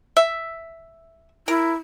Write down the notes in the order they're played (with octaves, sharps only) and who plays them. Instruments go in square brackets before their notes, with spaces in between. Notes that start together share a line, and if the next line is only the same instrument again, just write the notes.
[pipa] E5
[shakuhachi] E4 [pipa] A#4